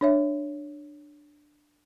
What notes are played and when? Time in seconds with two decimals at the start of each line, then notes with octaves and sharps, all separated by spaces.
0.01 D4 C#5 E5